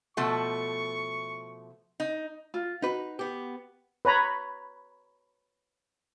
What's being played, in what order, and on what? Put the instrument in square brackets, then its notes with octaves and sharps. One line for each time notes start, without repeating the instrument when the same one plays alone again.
[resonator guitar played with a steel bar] B2 F3 A3 [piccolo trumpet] C#6
[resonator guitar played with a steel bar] D#4
[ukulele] F4
[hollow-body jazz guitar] D#4 B4 [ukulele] F#4
[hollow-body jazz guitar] B3 G4
[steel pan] B4 C#5 A#5 B5